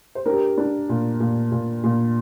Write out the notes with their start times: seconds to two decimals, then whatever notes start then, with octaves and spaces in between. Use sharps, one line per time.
0.15 C5
0.26 D4 G4 A#4
0.58 D4
0.89 A#2
1.20 A#2
1.52 A#2
1.84 A#2